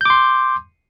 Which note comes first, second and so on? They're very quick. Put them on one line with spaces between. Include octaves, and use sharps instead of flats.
G6 D6 C6